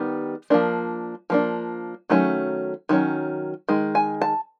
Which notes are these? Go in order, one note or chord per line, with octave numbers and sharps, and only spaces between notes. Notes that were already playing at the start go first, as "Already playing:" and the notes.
Already playing: D#3 G3 B3
F3 A#3 D4
F3 A#3 D4
D#3 F#3 A3 C#4
D#3 F#3 C#4
D#3 G#3
G#5
A5